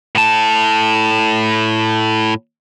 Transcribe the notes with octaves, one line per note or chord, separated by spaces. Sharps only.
A2 A5